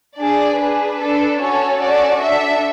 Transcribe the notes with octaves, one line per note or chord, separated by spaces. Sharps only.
D4 G#4 D5
D4 G#4 B4
D4 A4
C#4 F#4 A4 C#5
C#4 F#4 A4 D5
D4 A4 E5